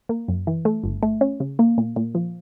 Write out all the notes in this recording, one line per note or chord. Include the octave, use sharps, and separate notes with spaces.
A#3
F#2
E3
A3
G1
A3
C#4
C#3
A#3
A#2
A#2
F3